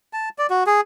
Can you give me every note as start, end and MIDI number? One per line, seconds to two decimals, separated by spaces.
0.13 0.29 81
0.38 0.47 74
0.50 0.64 66
0.67 0.81 68